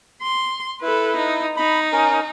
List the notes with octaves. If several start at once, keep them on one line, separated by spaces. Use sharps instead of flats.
C6
E4 A4 B4
D#4
D#4 B5
C#4 A#4